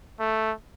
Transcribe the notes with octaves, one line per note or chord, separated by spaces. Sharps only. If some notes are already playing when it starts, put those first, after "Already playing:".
A3